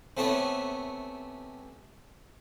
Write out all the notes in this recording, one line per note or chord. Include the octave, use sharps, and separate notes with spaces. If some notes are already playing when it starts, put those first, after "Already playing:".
C3 A3 B3 C#4